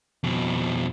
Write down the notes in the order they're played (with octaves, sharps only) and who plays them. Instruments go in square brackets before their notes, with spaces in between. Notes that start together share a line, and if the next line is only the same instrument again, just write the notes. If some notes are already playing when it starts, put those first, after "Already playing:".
[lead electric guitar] F2 B2